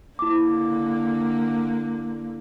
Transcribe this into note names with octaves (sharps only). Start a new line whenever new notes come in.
D3 A#3 E4 D6